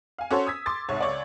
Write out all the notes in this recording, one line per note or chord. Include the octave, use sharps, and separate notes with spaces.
F5 G#5
C#4 F#4 A4 C5 C#5
D#6 E6 G#6 B6
C6 D6 A6
C2 G#2 C#5
C#2 C#5 D5